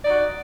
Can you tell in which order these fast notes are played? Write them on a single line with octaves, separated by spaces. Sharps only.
D5 D#4 F#4